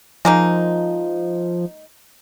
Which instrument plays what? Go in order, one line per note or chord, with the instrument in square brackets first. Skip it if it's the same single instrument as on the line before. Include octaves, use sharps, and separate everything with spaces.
[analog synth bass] F3 [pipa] G#3 A#3 D#4